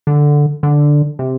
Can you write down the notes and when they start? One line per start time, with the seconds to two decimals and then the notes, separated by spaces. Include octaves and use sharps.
0.07 D3
0.63 D3
1.19 C3